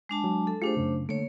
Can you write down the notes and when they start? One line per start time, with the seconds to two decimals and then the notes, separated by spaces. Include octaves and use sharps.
0.09 G#3 D4 A5
0.24 F#3
0.47 A4
0.62 A3 D4 F4 G4 G#4 C5
0.77 F#2 C#3
1.09 D3 A3 A#3 C#5